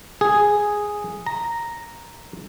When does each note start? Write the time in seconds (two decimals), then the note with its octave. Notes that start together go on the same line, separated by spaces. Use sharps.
0.21 G#4
1.26 A#5